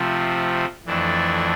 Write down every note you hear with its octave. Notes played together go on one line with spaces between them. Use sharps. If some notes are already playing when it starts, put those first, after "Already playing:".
Already playing: C3 F3 A3
F2 E3 A3 D4